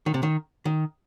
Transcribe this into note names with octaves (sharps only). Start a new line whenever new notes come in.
D#3
C3
D#3
D#3